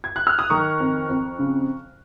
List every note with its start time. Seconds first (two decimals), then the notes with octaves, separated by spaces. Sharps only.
0.04 G#6
0.16 F#6
0.27 F6
0.39 D#6
0.50 D#3 A#5 C#6
0.80 F2
1.09 F2
1.39 C#3